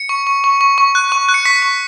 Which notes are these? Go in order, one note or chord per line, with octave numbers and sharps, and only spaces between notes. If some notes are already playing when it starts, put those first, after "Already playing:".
Already playing: C#7
C#6
C#6
C#6
C#6
C#6
F#6
C#6
F#6
C#7
C#6 B6
C#6